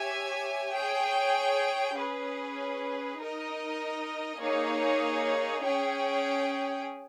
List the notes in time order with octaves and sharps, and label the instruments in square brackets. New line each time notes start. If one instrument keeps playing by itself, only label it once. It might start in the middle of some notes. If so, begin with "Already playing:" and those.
Already playing: [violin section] G4 C#5 E5 G#5
G#4 C#5 G5
C#4 G#4 B4
D#4 A#4 D#5
A#3 D#4 G#4 C#5
C#4 G#4 C#5 G5